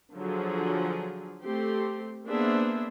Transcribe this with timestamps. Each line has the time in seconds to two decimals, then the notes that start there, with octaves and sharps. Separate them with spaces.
0.15 D3 F3 F#3 G#4
1.43 A3 C4 G4 C6
2.25 A#3 B3 D4 G#4 C5 E5